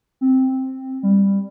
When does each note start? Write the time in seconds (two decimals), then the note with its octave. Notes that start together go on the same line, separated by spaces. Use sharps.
0.21 C4
1.03 G3